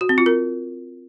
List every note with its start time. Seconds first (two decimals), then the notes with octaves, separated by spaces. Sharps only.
0.01 F#4
0.09 C4
0.18 F4
0.26 A#4